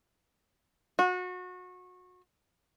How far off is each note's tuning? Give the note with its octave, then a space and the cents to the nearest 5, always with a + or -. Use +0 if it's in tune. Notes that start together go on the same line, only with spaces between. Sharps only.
F#4 -30